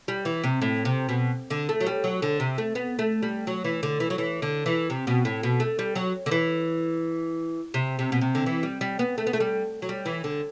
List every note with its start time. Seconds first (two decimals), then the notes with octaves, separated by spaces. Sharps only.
0.08 G3
0.25 E3
0.44 C3
0.62 A2
0.85 C3
1.09 B2
1.50 D3
1.69 A3
1.81 F#3
1.86 G3
2.04 F#3
2.22 D3
2.40 C3
2.58 A3
2.75 B3
2.99 A3
3.22 G3
3.47 F#3
3.64 E3
3.83 D3
4.00 E3
4.10 F#3
4.18 E3
4.42 D3
4.66 E3
4.90 C3
5.07 B2
5.25 A2
5.43 B2
5.60 A3
5.79 G3
5.96 F#3
6.26 D3
6.31 E3
7.74 C3
7.99 C3
8.12 B2
8.21 C3
8.35 D3
8.46 E3
8.63 G3
8.81 G3
8.99 B3
9.18 A3
9.27 B3
9.33 A3
9.40 G3
9.82 F#3
9.89 G3
10.06 E3
10.24 D3